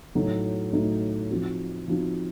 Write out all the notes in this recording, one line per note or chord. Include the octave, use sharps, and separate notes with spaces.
A2 F#3 A3 D#4 F#4
A2 F#3 A3 D#4 F#4
F3 C4 D#4 F#4
F3 C4 D#4 F#4